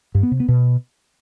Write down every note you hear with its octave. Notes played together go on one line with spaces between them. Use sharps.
G2
B3
C3
B3
B2